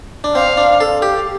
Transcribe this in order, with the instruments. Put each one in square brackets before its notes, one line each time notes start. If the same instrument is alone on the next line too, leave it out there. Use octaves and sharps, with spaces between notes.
[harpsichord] D4
[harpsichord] C4 [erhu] F5
[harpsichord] D4
A4
G4